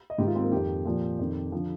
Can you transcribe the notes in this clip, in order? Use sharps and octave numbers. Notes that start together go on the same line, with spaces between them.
D#5
G#2 D#3 G4
F4
C4
A#3
F2 D#3 G4
A#2 F3
F2 D#3
D3 F3